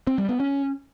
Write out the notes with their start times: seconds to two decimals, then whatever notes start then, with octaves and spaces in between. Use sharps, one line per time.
0.07 C4
0.18 G3
0.29 B3
0.40 C#4